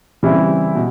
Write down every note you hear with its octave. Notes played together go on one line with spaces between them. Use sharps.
C#3 E3 G3 C4 E4
B2